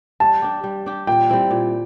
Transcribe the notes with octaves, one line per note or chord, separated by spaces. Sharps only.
G3 A5
D4 G4
G3
D4 G4
A#2 G5
G3 C4 E4
A#2